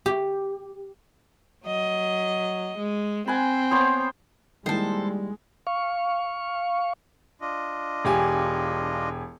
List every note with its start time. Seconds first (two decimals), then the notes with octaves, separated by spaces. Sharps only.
0.06 G4
1.66 F#3 D#5
2.77 G#3
3.28 C4 F#5 G#5 B5
3.71 B3 C5 C#5
4.66 D#3 G3 G#3 A#3 E4 A4 C5
5.67 F5 C#6
7.41 D4 F4 D#5
8.05 E1 G4 G#5